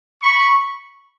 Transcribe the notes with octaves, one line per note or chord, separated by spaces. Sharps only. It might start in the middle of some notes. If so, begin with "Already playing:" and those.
B5 C#6